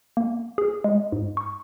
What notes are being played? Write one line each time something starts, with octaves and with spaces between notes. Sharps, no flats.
A#3
G#4
G#3
G#2
C#6